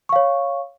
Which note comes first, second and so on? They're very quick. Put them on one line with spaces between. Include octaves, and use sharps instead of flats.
C#6 F5 C#5